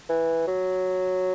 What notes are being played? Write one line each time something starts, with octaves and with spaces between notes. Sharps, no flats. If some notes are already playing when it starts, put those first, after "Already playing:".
E3
F#3